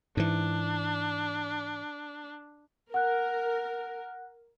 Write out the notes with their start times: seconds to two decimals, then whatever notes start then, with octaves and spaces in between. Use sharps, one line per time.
0.17 G#2 E3 D4
2.94 A#4 F#5 F#6